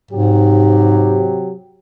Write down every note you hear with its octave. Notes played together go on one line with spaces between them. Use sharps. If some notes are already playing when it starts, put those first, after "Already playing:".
G#2 C3 F#3 G4